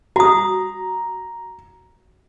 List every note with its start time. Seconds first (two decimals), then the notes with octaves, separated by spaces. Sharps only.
0.16 F#4 A#5 D#6